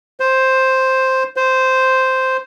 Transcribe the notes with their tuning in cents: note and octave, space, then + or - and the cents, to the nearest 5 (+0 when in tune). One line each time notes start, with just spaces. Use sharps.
C5 +5
C5 -5